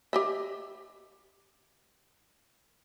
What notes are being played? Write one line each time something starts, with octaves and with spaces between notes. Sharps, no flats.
G4 D#5 E5